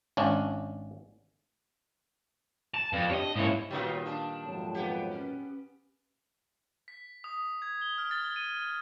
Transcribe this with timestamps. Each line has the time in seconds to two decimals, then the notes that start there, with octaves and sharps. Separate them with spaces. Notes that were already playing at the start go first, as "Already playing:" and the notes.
0.17 G#1 C#4 D4
2.74 A5
2.93 F2 B4 D5 F5
3.10 D4 G4 C#5 D#5
3.36 G#2 A#3 C#4 E4 C#5
3.70 A#2 D#3 F#3 G3 B3 D#4 F4
4.05 D4 A5
4.44 F2 G#2 F#3
4.74 B3 G4 F#5
5.11 C#4
6.88 B6
7.24 D#6
7.62 G#6
7.81 G7
7.98 F6
8.11 A6
8.36 D#7